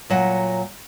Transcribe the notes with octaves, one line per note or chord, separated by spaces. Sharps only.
A#2 F#3 F#5